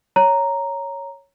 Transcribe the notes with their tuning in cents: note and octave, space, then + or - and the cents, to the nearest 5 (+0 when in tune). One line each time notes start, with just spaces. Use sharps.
C#5 +0 A#5 +0